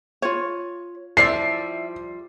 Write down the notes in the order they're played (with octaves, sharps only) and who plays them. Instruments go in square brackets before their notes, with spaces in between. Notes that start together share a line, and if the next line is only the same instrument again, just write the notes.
[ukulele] F4 C#5
[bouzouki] F3 G3 E5 [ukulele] E4 D5 [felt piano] C7